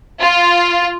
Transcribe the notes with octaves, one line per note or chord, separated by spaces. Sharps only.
F4